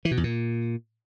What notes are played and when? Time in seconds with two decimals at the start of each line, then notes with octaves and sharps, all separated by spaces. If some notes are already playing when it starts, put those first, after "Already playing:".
0.05 E3
0.11 B2
0.17 E2
0.24 A#2